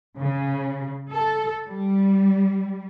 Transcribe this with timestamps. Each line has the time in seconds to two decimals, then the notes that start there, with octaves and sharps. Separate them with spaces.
0.18 C#3
1.11 A4
1.68 G3